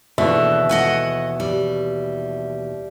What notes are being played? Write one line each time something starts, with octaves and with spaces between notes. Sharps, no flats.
D#2 B2 D3 E3 E5
D#5 F#5 G#5
G3